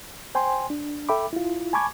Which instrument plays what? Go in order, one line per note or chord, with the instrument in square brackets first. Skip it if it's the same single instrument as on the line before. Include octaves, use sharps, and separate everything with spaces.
[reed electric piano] C5 G5 G#5 C6
D4
A4 E5 G5 B5 D6
E4 F4
G#5 A5 B5 C#6 D6 G#6